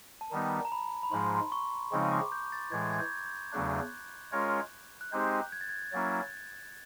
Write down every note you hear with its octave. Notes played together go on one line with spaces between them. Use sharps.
A5
D#3 G3 B3 D#4 A#5
A#5
B5
B5
G#2 F3 G#3 C6
C#6
C#3 F3 G#3 C4 D#4 C#6
D6
G6
A6
A2 E3 G#3 G#6
G#6
G6
G6
E2 C#3 F#3 A3 D4 F#6
G#3 C#4 F4 A#4 C#5
F#6
G#3 C4 D#4 G4 C5 G6
G#6
A6
G#6
F#3 A#3 C#4 E4 A6